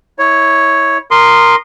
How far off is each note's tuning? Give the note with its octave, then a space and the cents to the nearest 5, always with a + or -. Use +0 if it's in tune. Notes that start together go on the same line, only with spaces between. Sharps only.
E4 -25 C#5 +0
A#4 +0 C6 +0 D#6 -30